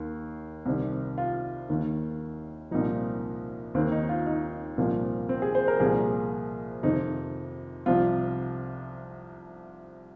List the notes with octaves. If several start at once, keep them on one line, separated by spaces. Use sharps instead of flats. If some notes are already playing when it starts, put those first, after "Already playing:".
Already playing: D#2 D#3
C2 C3 D#3
F4
D#2 D#3
C2 A#2 F3 D#4
D#2 D#3 C4
D#4
F4
D#4
C2 A#2 F3
C4
G#4
C5
A#4
C2 A#2 F3 G#4
F2 C3 D#3 D#4
C2 C3 F3 F4